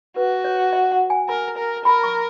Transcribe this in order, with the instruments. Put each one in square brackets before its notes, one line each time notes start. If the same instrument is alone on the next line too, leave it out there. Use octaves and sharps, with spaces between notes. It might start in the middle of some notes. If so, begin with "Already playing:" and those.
[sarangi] F#4 [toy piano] B4
[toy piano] C#5
E5
F#5
G#5
[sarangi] A#4 [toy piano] A#5
[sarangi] A#4
[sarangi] A#4 [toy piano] B5
[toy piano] C#6